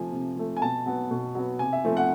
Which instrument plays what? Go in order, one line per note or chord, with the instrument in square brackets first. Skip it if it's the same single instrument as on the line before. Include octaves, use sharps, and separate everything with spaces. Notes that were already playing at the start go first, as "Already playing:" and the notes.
Already playing: [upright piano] C3 F3 A3 G#5
C3
F3 A3
G#5
B2 A5
F#3 B3
B2
F#3 B3
C3 G#5
E5
F3 A3 C4
F#5